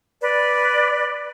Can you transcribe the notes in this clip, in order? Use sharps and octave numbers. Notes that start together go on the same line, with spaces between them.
B4 D5